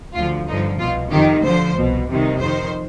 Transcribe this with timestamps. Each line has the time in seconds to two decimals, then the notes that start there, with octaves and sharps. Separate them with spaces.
0.15 D2 D3 F3 F4
0.48 G2 D3 F3 D#4
0.79 C2 B2 F4
1.11 F2 C3 D#3 G4
1.43 D2 D3 F3 C5
1.75 C2 B2
2.07 C2 C3 D#3
2.39 F2 D#3 C5